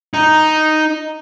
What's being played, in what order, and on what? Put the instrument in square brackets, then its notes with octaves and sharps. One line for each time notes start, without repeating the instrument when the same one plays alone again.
[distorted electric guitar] D#4